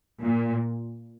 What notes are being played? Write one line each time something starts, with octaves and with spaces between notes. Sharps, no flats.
A#2